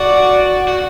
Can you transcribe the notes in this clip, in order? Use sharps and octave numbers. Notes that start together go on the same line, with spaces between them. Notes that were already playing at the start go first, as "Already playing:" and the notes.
Already playing: F#4 D5
F#4